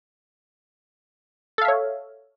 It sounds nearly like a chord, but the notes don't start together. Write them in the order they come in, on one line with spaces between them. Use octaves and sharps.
A4 F5 E5 C#5